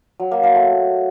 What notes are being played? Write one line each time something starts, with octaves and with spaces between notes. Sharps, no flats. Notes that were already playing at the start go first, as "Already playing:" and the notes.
F#3
A#3
A#3
A3